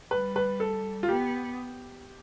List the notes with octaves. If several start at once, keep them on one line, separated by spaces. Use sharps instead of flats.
G3 B4
B4
A4
F4
B3 G4